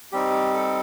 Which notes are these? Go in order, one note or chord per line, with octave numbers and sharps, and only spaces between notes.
G3 C4 D#4 G4
A4